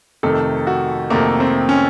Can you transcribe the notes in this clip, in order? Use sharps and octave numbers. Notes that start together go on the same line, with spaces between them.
F2 C3 D#3 A3 A4
F#4
F2 C3 D#3 A3 A#3
C4
C#4